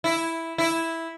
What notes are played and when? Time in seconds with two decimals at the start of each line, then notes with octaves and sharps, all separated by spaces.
0.04 E4
0.58 E4